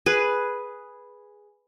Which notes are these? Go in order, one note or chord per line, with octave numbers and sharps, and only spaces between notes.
G#4 B4